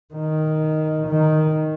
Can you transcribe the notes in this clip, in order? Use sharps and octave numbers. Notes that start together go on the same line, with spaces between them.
D#3
D#3